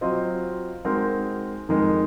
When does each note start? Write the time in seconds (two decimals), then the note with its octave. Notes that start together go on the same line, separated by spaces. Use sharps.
0.01 F#3 C4 F4 C5 D#5
0.85 G#3 C4 D#4 F#4 A#4
1.69 F2 D#3 G#3 D#4 A#4